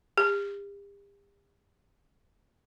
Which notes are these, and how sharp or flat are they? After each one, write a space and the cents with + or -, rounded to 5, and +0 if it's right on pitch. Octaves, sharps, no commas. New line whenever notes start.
G4 +40